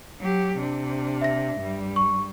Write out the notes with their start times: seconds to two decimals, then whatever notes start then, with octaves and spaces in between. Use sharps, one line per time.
0.19 F#3 G4
0.58 C3 D4
1.21 E5 A#6
1.59 G2 G3
1.96 C#6